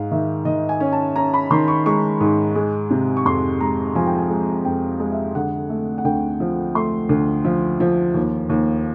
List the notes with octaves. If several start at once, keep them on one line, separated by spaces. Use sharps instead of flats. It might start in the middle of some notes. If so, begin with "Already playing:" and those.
Already playing: G#2 F5
D#3 E5
D#3 D#5
G#5
C#4
A5
C#4 A#5
B5
D#3 C6
C#6
G#3 C#6
G#2
G#3
C3
C#6
F2 C6
G#3 A#5
F3 G#5
G5
G#5
G#3
F2 G5
G#3
E5
D3 F#5
A3
F#5
D2 G5
F3
A3 C6
D2
F3
F3
D#2
D#2